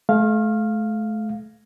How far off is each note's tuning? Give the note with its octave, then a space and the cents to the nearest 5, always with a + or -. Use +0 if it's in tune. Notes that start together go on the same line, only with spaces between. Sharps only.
A3 -35 F5 +0